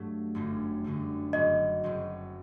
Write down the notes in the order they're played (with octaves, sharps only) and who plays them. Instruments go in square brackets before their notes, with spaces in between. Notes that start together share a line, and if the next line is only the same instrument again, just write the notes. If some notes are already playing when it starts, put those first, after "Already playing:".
Already playing: [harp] G2 F#3 A3
G1 F#2 D3 G3
G1 F#2 D3 G3
[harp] F#1 F#2 F#3 C4 [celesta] D#5
[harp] F#1 F#2 F#3 C4